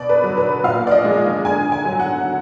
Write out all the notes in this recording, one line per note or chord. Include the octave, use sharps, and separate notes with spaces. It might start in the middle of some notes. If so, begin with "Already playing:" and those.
Already playing: B2 D5
B4
F#3
B4
A#2 F5
D5
D#5
F3 G#3
D3 G#5
G#5
F#3
F#5